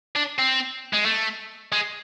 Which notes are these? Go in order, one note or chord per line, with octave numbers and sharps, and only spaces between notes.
D4
C4
G#3
A3
G#3